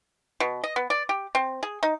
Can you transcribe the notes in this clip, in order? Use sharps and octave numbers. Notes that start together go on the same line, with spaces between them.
B2
D#5
B3
D5
G4
C4
G#4
D#4